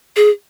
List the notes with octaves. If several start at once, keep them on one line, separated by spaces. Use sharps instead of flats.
G#4